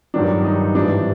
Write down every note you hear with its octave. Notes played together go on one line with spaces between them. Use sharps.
G2 D#3 F#3 D4
D#4
G#2 E3 G3 D4